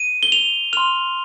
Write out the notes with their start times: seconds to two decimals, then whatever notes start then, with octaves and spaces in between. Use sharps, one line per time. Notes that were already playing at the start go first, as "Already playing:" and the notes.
Already playing: D#7
0.23 G7
0.32 F7
0.73 C6 F6 F7